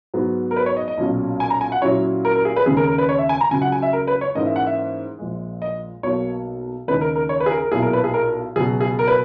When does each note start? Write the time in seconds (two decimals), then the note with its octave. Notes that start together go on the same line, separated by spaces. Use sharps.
0.14 G#2 F#3 B3
0.51 A#4
0.56 B4
0.66 C#5
0.77 D#5
0.88 D#5
0.98 B1 A#2 F#3 C#4
1.40 G#5
1.50 A#5
1.61 G#5
1.72 F#5
1.82 A#2 F#3 C#4 E4 C#5
2.25 A#4
2.35 A#4
2.45 G#4
2.56 B4
2.66 D#2 C#3 G#3 G#4
2.77 A#4
2.87 A#4
2.98 B4
3.09 C#5
3.18 E5
3.29 G#5
3.41 A#5
3.51 C#2 C#3 F#3 G#5
3.62 F#5
3.72 G#5
3.82 E5
3.93 A#4
4.07 B4
4.21 C#5
4.35 G#2 E3 A#3 C#4 D#5
4.46 E5
4.56 F#5
4.66 E5
5.19 A#1 A#2 G#3
5.62 D#5
6.03 B1 B2 A#3 C#5
6.88 D#2 C#3 G#3 D#4 B4
7.01 A#4
7.16 A#4
7.29 C#5
7.40 B4
7.46 G#4
7.51 A#4
7.62 A#4
7.72 B1 A#2 A#3 E4 G#4
7.82 A#4
7.93 B4
8.04 G#4
8.14 A#4
8.56 C#2 B2 F#3 G#4
8.81 G#4
8.99 A#4
9.08 B4